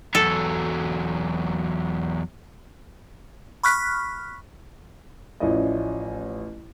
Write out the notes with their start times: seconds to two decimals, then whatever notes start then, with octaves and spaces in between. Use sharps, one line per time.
0.15 E2 F#3 A4
3.63 B5 C#6 F6 F#6 B6
5.40 A1 F3 C#4 E4 D5 D#5